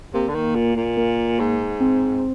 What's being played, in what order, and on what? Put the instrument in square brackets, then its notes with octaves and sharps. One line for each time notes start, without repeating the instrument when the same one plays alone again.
[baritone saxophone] C3 [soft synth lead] A#3
[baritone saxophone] D3
D#3
A#2
A#2
[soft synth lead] A#3
[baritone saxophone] G#2
[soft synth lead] C4